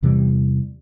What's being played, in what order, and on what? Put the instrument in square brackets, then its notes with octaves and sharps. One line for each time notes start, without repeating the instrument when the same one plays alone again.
[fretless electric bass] E2 C3 E3 G3